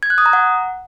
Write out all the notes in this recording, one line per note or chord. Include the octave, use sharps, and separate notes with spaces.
G#6
F#6
D#6
A#5
F#5